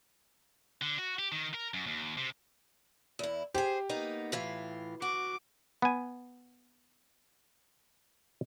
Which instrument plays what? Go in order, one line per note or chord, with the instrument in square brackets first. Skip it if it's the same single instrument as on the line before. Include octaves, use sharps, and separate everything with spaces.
[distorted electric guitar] D3
F#4
G4
D#3
A#4
F#2
D#2
C3
[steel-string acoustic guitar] E2 E4
[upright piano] G4 [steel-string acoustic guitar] G#4 C5
[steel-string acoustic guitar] A#3 B3 D#4
A2 E3 F4
[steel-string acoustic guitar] F#4 [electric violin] D6
[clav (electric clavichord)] B3 G#5